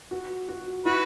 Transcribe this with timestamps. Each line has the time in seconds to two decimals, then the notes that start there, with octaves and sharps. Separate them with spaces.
0.11 F#4
0.49 F#4
0.85 E4 F#4 B4